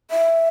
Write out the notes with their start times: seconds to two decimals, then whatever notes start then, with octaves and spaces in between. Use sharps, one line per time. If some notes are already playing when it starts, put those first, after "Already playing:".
0.11 E5